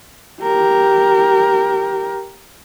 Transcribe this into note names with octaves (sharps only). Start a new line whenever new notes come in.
G4 A#4